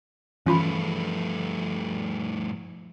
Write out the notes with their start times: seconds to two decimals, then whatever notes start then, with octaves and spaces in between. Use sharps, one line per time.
0.46 G2 E3 F3 A3 C#4 F4 B5